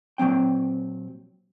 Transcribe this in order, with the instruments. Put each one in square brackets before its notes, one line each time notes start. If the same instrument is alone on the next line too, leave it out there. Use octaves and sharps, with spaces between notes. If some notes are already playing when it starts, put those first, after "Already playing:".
[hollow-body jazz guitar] A#2 F#3 G#3 C4 G5